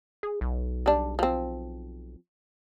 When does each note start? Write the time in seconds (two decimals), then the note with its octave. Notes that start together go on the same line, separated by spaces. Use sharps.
0.23 G#4
0.41 B1
0.86 G3 D4
1.19 F3 C4